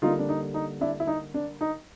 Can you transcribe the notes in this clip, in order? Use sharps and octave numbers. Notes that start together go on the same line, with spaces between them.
D3 G3 A#3 D#4 F4
D4
D#4
D#4
D4 E4
E4
D#4
D4
D#4